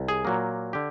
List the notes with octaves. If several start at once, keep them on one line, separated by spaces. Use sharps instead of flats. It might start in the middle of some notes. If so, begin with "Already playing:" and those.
Already playing: C2
G#4
A#2 F#3 A#3
D3 G4